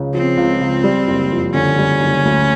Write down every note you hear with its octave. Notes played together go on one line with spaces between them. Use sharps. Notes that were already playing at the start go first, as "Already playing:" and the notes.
Already playing: C#2 C#3
F3 C4
C#2
C#2
G3
F#1
F2
D3 C#4
G3
F#1
D2